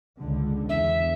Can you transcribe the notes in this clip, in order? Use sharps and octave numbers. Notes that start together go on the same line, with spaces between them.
C#2 D3
E2 E5